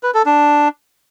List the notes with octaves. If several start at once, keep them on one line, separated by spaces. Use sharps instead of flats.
B4
A4
D4